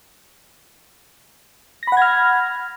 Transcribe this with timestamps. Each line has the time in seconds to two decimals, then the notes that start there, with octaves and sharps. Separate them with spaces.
1.83 A#6
1.87 B5
1.92 F#5
1.97 G#6
2.02 F6